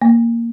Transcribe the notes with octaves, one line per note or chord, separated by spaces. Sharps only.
A#3